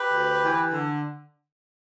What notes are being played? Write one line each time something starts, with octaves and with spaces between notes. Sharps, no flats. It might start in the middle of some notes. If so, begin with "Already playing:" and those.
Already playing: G4 B4
D2
E3
D3